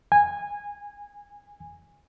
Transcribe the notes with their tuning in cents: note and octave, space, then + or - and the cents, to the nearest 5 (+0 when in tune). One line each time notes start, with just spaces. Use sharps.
G#5 -15